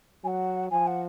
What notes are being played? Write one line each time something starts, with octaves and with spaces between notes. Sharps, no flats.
F#3 F#5 G#5
F3 G#5
F#5